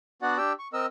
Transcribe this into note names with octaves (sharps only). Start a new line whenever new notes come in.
B3 D4 F#4 D5 F#5
D4 G4 G5 E6
C#6
C4 A#4 D#5 E6